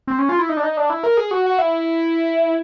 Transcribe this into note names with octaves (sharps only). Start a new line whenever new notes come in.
C4
C#4
F4
E4
D#4
D4
D#4
D4
E4
A#4
G#4
F#4
F#4
E4